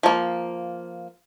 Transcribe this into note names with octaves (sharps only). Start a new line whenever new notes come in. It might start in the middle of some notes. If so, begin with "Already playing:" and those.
F3 A#3